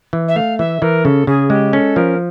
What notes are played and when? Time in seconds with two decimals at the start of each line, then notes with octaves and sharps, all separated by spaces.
0.13 E3
0.28 E5
0.36 A3 F5
0.58 E3 E5
0.82 E3 A#4
1.04 C#3 A4
1.27 C#3 G#4
1.50 G#3 G4
1.73 C#4 A4
1.96 F3 A#4